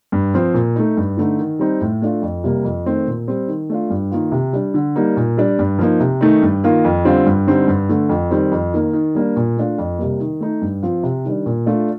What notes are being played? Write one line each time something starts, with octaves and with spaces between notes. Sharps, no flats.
G2
F3 C4
A#2
A3 D#4
G2
D3 A3 D#4
D#3
G3 C4 D#4
A2
A3 D4 F4
F2
C3 G3 A#3
F2
D#3 A3 C4
A#2
G3 C4
D#3
A3 D4 F4
G2
D#3 A#3 F4
C3
G3 D4
D3
G3 A#3 D#4
A#2
G3 D4
G2
F3 A#3 D#4
C3
D#3 A3 D#4
G2
D#3 A#3 F4
F2
D3 G3 C4 F4
G2
D3 G3 C4 D#4
G2
D3 A3
F2
D#3 G3 C4
F2
D#3 A#3
D#3
G3 A#3 D4
A#2
A3 D4 F4
F2
C3 G3 A#3
D#3
A3 D#4
G2
F3 C4 F4
C3
D#3 G3 D4
A#2
A3 D4 F4